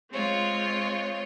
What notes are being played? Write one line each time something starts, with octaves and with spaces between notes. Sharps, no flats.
G#3 C4 F4 C#5